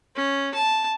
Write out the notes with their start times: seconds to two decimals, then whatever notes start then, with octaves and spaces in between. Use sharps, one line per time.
0.16 C#4
0.54 A5